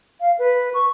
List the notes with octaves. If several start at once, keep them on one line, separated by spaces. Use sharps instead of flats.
F5
B4
C#6